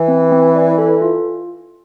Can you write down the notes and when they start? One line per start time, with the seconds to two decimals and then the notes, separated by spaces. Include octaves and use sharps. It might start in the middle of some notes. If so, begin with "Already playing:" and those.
Already playing: E3
0.08 C4
0.32 C4
0.56 D5
0.78 A4
1.02 F4